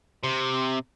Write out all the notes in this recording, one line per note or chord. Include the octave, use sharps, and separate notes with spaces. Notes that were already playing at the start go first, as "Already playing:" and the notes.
C3